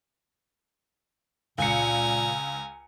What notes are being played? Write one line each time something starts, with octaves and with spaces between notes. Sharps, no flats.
C#2 A#2 G#5 A#5 C#7